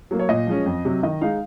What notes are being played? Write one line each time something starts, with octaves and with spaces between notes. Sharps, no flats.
F#3 A#3
C#5
A#2 D#5
F3 G#3 C#4
F2
C3 F#3
D#3 D#5
G#3 D#4 F5